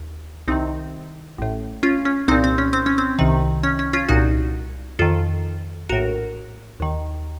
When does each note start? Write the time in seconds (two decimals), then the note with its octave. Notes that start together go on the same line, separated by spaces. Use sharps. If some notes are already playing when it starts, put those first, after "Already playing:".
Already playing: D#2
0.48 C2 C3 D#3 C4 D#4
1.38 A1 A2
1.83 C#4 F4
2.05 C#4
2.28 C2 C4 D#4
2.31 A#2
2.44 C4
2.58 C#4
2.73 C4
2.86 C#4
2.98 C4
3.19 C2 C3 D#3
3.63 C#4
3.79 C#4
3.93 C#4 F4
4.09 C2 A#2 D#4 F#4
4.99 F2 D#3 F4 A4
5.89 A#1 A2 F#4 A#4
6.80 D#2 D#3